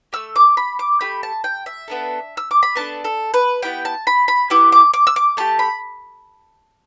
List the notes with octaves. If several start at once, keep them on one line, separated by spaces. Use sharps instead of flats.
A3 G4 E6
D6
B5
D6
A3 G4 B5
A5
G5
E5
B3 D4 A4
E6
D6
B5
B3 D4 A4 A5
A4
B4
B3 E4 G4 G5
A5
B5
B5
B3 E4 G4 D6
D6
D6
E6
D6
A3 D4 G4 A5
B5